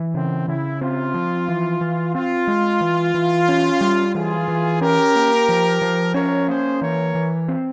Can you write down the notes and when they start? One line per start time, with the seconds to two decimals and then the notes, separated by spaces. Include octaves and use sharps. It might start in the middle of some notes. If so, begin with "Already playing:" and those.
Already playing: E3
0.14 C#3 C4
0.48 C#3 E4
0.81 C4 F4
1.14 F3
1.48 E3
1.81 E3
2.14 C4 F4
2.47 G#3
2.81 E3
3.14 E3
3.49 C#4
3.81 G3
4.15 E3 F4 G#4
4.48 E3
4.81 C#4 G4 A#4
5.15 A#3
5.49 F3
5.82 F3
6.14 C#4 A#4 C#5
6.48 A#3 G#4 C5
6.81 E3 A#4 C#5
7.15 E3
7.48 C4